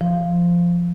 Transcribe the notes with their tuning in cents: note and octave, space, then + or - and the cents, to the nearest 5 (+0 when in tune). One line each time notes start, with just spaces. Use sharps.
F3 -5